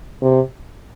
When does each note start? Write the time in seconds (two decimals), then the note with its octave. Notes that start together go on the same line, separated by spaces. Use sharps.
0.22 C3